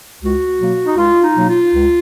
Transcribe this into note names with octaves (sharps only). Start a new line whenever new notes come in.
C#2 F#4
B2 F#3 A#3
D#4
C#2 F4
D#4
B2 F#3 A#3
F4
C#2